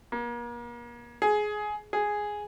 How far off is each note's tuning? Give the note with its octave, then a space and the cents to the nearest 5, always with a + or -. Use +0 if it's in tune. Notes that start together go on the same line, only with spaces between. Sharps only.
A#3 +40
G#4 +15
G#4 +0